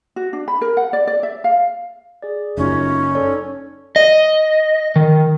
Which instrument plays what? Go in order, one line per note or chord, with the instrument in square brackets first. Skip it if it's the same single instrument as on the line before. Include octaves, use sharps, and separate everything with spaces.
[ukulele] F#4
D4
B5
A#4
F#5
D5
D5
E5
F5
[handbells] G#4 D5
[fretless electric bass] F#1 F#2 [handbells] A3 F4 [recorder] C#4 [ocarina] D#4
[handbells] A4 C#5 D5
[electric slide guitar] D#5
D#3